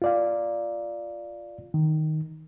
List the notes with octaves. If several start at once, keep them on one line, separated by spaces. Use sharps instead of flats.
F4 D5 F5
D#3